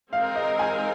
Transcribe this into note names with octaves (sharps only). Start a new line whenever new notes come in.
G#3 C4 D#4 A#4 F5
D#5
G#5